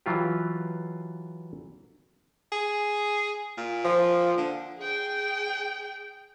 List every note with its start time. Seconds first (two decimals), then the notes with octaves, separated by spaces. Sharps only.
0.06 E3 F#3 F4 G4
2.52 G#4
3.58 A#2
3.85 F3
4.37 D3
4.79 G#4 G5